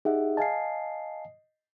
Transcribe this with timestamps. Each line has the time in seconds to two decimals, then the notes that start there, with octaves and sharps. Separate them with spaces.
0.05 D#4 G4 G#4 E5 F#5
0.37 D#5 F5 G#5 A5 C7